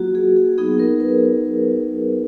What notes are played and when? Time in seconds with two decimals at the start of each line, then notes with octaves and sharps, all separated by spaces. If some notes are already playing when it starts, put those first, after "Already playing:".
Already playing: F#3 A#3 F4 F#4 G#4
0.15 G#4
0.36 G#4
0.58 F#3 B3 D#4 G#4
0.79 A#4
1.00 B4